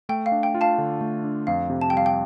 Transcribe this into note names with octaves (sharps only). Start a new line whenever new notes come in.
A3 G5
F5
D4
G5
F4
F5 A5
D3
A3
D4
F2 F5
C3
A5
G5
G3 F5
G5